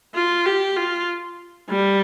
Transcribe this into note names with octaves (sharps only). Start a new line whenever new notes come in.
F4
G4
F4
G3